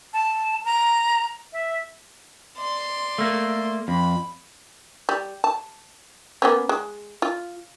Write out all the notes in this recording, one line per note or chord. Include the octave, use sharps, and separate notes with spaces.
A5
A#5
E5
D5 C6
A3 A#3
F2 B5
G3
A5
A#3 B3 C#4
G#3
F4